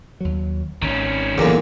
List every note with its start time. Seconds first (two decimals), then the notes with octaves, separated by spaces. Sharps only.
0.21 D#2 F#3
0.82 G#1 D#3 C#4
1.38 F#1 E2 A#2 D3